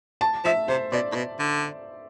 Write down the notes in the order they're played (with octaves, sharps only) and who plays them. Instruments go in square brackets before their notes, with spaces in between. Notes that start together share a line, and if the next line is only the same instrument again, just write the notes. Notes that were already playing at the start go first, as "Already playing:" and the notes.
[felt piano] A5
[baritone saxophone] F3 [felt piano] E5
[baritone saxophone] C3 [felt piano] C5
[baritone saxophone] B2 [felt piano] D5
[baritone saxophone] A2
B2
D3